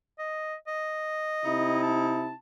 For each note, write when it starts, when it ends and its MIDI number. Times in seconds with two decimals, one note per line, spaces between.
0.19 0.55 75
0.67 1.78 75
1.45 2.33 48
1.45 2.33 63
1.45 2.33 64
1.83 2.34 81